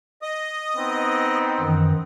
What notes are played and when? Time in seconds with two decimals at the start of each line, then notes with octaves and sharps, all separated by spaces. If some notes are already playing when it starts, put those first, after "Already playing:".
0.22 D#5 D#6
0.77 B3 C4 D#4
1.61 F#2 D#3 E3